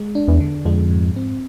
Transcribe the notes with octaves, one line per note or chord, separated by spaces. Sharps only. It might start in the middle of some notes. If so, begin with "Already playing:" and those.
Already playing: G#3
D4
E2
D3
F2 G#3
G#2
C4